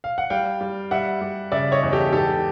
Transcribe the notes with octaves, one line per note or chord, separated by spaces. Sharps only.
F5
F#5
G3 F5 G5
G3
G3 E5 F#5
G3
C#3 D5 E5
C#5 D#5
E2
G4 A4
G#2 G4 A4